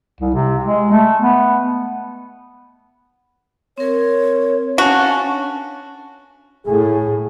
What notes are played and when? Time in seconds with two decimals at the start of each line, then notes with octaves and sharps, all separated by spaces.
0.20 C2
0.34 C3
0.63 G#3
0.91 A3
1.19 B3
3.78 C4 A#4 C#5
4.78 C#4 D4 F#4 F5 A5
6.66 A2 G#4